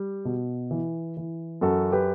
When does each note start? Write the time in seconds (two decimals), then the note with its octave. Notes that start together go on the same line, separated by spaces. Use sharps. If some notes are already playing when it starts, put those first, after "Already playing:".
Already playing: G3
0.25 B2
0.71 E3
1.17 E3
1.61 F#2 F#4 A4
1.92 G4 B4